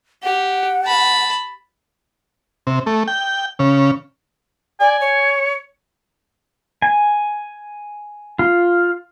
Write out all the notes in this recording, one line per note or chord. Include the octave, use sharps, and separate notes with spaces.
G4 F#5
A5 B5
C3
A3
G5
C#3
D5 G#5
C#5
G#5
F4